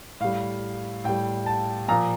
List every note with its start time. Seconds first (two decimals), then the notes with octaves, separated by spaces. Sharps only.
0.20 A2 G3 F5
1.04 A2 G3 G5
1.46 A5
1.88 A#2 F3 A#5